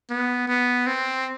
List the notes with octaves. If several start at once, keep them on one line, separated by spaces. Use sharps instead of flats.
B3
B3
C4